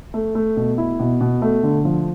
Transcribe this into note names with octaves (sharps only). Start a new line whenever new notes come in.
A3
A3
B2
E4
B2
B2
A3
D3
F3